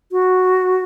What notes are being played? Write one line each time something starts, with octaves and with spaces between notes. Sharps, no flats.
F#4